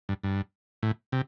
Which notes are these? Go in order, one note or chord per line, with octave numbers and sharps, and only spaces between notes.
G2
G2
A2
C3